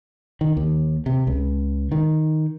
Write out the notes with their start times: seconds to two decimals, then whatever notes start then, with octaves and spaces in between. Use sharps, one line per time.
0.41 D#3
0.57 D#2
1.06 C3
1.27 C#2
1.92 D#3